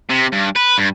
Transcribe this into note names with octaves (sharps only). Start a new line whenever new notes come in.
C3
G2
B4
G2